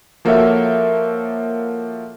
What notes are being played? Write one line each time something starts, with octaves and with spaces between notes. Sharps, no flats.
F3 A#3 F#4 A4 C#5 E5